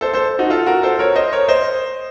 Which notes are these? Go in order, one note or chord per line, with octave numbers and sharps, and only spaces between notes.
A4 C5
A4 C5
D#4 F#4
F4 A4
F#4 A#4
A4 C5
A#4 C#5
C5 D#5
A#4 C#5
C5 D#5